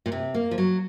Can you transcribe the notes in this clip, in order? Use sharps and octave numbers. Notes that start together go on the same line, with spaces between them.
A#2
C3
A#3
F3
F#3